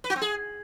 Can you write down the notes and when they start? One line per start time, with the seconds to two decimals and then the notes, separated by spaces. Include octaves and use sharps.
0.04 B4
0.10 F#4
0.16 C4
0.21 G#4